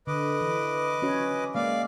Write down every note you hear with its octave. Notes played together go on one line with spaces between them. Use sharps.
D3 B4 D#5 D6
E3
C#4 F#4 C#5
G#3 A#3 D5 F5